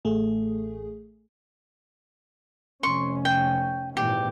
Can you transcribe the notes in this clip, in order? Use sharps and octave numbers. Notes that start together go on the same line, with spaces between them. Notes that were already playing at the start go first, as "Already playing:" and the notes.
A1 A3 G#4
F1 C#4 C6 C#6
G5
G#1 A#2 E3 G4